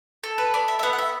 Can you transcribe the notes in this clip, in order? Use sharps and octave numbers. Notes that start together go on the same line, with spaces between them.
A4
B4
B3 D5
E5
E5
B3 F#5
F#5
E5